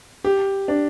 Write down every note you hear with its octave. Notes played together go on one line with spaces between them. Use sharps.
G4
D4